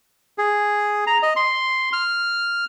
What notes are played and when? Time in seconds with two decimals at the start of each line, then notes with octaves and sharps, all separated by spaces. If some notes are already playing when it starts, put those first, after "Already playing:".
0.38 G#4
1.07 A#5
1.23 D#5
1.36 C6
1.93 F6